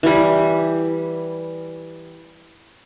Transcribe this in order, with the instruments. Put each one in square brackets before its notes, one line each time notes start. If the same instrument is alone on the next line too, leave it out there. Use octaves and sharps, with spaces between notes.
[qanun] E3 G3